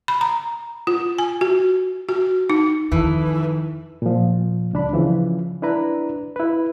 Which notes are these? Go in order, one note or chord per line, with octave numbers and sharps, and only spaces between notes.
B5
A#5
F4
G#5
F#4
F#4
D#4
F2 D#3 E3 A4
A#2 F3
C#2 D4 B5
C#3 E3 F3
D4 E4 B4 A#5
E4 B4